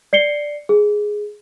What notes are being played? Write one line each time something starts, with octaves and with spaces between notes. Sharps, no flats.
D5 C7 C#7 G7
G#4